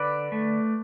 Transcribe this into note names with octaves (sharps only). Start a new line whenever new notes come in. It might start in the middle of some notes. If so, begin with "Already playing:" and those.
Already playing: D3 B4 D5
A3